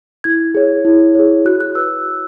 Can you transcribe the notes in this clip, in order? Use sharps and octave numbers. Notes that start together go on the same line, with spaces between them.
E4 G#6
G#4 C#5
E4
G#4 C#5
F#4 F#6
F#6
B4 E6